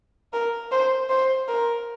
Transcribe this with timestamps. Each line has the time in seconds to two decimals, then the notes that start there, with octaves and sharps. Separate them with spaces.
0.33 A#4
0.72 C5
1.10 C5
1.48 A#4